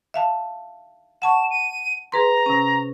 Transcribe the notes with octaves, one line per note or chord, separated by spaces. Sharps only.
E5 F5 A5
F#5 A5 C#6 E7
D#7
G#4 B4 A#5 C6
C3 C#4